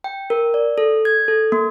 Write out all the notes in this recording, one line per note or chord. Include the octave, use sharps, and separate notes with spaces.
G5
A#4
D5
A4
G#6
A4
A#3